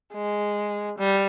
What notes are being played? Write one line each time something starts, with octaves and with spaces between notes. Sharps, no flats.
G#3
G3